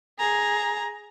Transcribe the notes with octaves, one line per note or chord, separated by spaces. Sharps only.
G#4 A#5